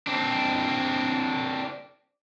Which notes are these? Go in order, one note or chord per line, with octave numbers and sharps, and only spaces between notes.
C4 D4